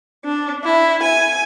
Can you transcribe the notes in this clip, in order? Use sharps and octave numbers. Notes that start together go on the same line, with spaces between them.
D4
E4
G#5